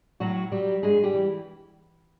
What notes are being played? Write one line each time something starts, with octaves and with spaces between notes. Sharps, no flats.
A2 F#3 F#4
F#3 G3 G4
G2 G#3 G#4
G3 G4
E3